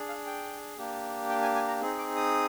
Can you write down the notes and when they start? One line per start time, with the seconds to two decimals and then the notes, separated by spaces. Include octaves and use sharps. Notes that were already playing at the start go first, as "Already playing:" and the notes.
Already playing: D4 G#4
0.09 F5
0.26 G5
0.78 A#3 D4 G4
1.29 G5
1.42 G#5
1.55 G#5
1.68 A#5
1.81 C4 D#4 G#4
1.98 D6
2.16 D#6